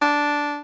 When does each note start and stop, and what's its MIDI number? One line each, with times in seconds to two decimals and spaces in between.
0.02 0.60 62